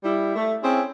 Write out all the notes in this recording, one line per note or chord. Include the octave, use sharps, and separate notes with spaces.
G3 E4
A3
C4 C#4 E4 G#4